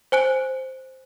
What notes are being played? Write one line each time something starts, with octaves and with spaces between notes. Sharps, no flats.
C5 G#5 F#6 D7